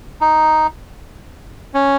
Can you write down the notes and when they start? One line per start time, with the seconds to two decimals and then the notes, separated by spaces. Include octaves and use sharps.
0.21 D#4
1.74 C#4